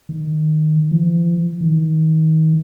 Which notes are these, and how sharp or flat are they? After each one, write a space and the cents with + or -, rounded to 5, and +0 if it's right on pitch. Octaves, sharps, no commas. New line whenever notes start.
D#3 -10
F3 -45
D#3 +30